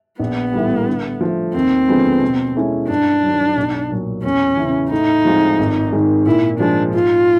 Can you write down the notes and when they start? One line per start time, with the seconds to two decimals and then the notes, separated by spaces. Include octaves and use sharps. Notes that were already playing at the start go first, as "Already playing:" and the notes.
0.19 A#1 B3
0.53 A2 E3 G3
0.87 D3
1.21 F3 A3
1.54 D#2 C4
1.88 D3 F3 G#3 B3
2.22 B2
2.56 G#3 C#4 E4 A4
2.89 G2 D4
3.23 D#3 F#3
3.57 B1
3.91 A#2 F#3
4.23 E2 C#4
4.57 E3
4.62 C#3
4.91 A2 D#4
5.25 F3 G#3 C4 F4
5.59 G#1
5.92 G#2 D#3 G#3
6.26 A#2 E4
6.59 F3 G#3 D4
6.94 G#2 F4